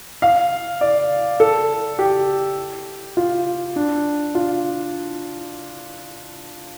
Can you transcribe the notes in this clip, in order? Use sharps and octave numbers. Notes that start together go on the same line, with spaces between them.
F5
D5
A4
G4
F4
D4
F4